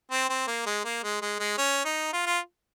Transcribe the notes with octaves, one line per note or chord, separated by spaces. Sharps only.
C4
C4
A#3
G#3
A#3
G#3
G#3
G#3
C#4
D#4
F4
F4